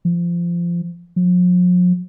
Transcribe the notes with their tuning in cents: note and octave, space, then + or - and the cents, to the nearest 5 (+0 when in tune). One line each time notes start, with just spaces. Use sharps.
F3 -20
F3 +45